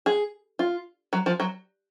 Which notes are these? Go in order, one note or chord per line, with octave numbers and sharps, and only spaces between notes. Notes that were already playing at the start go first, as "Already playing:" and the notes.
G#4
F4
F#3
F3
F#3